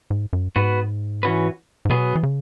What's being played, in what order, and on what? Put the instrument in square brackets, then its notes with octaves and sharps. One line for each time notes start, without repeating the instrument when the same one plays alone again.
[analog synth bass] G#2
F#2
[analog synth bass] G#2 [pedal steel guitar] B3 F#4 B4
[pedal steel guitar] E3 C#4 F#4 B4
[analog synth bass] G#2
[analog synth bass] B2 [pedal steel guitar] F#3 B3 G#4
[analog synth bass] E3
C#3